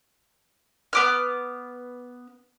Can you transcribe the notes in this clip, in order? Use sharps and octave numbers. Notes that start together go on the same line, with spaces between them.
B3 D6 F6